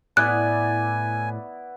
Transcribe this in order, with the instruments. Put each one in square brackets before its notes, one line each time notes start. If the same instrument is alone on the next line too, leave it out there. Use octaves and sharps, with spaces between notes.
[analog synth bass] A2 [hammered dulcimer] B3 E4 D5 [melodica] G#5 [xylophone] F#6